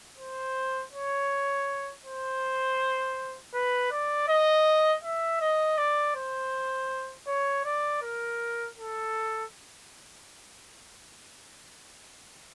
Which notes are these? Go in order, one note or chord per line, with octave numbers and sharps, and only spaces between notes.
C5
C#5
C5
B4
D5
D#5
E5
D#5
D5
C5
C#5
D5
A#4
A4